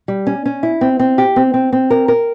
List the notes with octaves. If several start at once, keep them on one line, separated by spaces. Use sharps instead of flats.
G3
C#4
C#4
E4
C4
C4
G4
C4
C4
C4
A#4
A#4